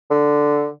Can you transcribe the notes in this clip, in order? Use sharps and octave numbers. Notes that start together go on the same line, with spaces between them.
D3